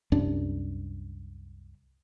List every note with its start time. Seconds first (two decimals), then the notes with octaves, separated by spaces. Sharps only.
0.12 C2 F#2 D4